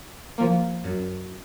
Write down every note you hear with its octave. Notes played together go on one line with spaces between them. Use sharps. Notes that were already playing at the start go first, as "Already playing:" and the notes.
F3 A#3
F#2